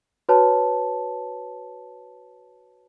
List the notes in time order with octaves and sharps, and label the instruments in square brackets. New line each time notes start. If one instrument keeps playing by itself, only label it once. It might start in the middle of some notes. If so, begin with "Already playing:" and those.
[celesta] F#4 B4 C#5 A5